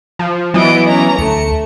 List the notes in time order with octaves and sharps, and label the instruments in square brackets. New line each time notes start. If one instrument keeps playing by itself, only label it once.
[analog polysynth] F3
[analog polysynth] E3 B3 [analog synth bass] F#3 [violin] D#5 D7
[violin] C#4 A#5
[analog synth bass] D2 [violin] A3 [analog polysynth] C#7